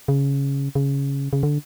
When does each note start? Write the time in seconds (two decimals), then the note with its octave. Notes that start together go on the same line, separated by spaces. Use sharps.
0.08 C#3
0.75 C#3
1.33 C#3
1.43 D3